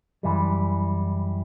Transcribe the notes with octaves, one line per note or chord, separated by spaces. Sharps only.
F#2 E3 G3